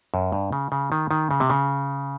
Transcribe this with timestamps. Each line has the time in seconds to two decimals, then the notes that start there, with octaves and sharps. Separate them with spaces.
0.14 F#2
0.32 G2
0.53 C#3
0.72 C#3
0.92 D#3
1.11 D#3
1.31 C#3
1.40 C3
1.50 C#3